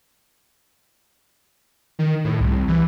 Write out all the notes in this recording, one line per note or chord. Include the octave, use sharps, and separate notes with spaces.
D#3
A2
C2
E3